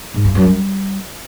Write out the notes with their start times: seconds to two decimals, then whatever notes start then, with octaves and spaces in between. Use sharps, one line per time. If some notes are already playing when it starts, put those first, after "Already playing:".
0.14 G#2
0.25 G2
0.35 F#2
0.46 G3